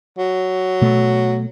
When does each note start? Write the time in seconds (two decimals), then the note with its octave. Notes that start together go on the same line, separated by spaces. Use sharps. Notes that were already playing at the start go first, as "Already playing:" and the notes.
0.18 F#3
0.81 B2 A3